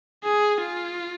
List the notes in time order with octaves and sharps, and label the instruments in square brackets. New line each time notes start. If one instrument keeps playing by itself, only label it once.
[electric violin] G#4
F4